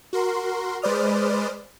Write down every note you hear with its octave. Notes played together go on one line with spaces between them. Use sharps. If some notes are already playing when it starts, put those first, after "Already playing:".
F#4 A#4 C6
G#3 B4 C5 D5 D#6 F6